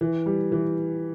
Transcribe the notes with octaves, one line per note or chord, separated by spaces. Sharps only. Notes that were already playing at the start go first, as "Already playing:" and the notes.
E3
G3
E3